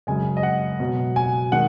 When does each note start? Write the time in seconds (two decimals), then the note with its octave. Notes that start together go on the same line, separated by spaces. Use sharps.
0.07 F#2 C#3 G#3 G#5
0.37 D#5
0.43 F#5
0.80 B2 F#3
1.16 G#5
1.52 D#3 G#3 F#5